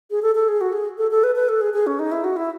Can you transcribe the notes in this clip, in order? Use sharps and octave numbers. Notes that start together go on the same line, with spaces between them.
G#4
A4
A4
G#4
F#4
G#4
A4
A4
B4
B4
A4
G#4
G#4
C#4
D#4
E4
F#4
E4